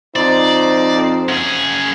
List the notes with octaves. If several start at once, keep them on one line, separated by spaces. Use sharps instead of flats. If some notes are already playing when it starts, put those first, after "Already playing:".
F2 D#4 C5 D5
F#2 G#4